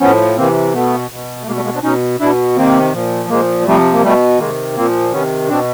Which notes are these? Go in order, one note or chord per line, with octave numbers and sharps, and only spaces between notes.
A2 F3 B3 C#4
C3 E3 A#3 C4
B2 A3 B3
B2
A3
B2 G#3 A#3
G3 A3
G#3 A#3
C4 D4
B2 C#4 D#4
B2 D4 E4
C3 D#3 A#3 C4
A#2 F3
A#2 F3 G#3 A#3
C3 F3 G3 A3
A#3
B2 G3 A3
C3 D#3 G#3 A#3
A#2 F3 A#3 C4
C3 D#3 B3 C#4
B2 C4 D4